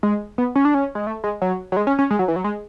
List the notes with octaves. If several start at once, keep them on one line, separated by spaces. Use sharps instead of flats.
G#3
B3
C#4
D4
C#4
G#3
A3
G#3
F#3
F#3
G#3
C#4
C#4
G#3
F#3
E3
F#3
G#3